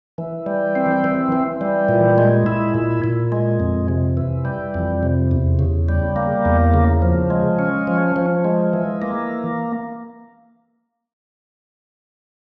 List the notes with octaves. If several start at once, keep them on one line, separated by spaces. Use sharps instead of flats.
E3
G3
C4
E3
E3
G3
A#2
G#3
E4
A#2
A#2
G#3
F2
C3
E3
G3
F2
C3
E2
C#3
G3
A#3
E2
C#3
F3
G#3
C#4
F3
F3
G#3
E3
A#3